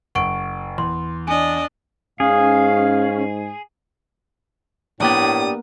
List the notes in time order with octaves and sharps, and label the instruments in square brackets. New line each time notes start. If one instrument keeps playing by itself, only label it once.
[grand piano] F#1 [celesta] F#5 C#6 D7
[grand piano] E2 [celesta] C6
[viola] D4 D#5 [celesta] G#5
[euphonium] G#2 [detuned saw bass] C#4 [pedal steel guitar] G#4 [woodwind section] F5
[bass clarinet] A2 [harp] A#3 B3 [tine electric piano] D4 G4 D5 [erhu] D#6